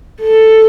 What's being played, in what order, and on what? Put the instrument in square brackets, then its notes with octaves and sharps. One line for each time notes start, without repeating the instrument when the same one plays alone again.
[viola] A4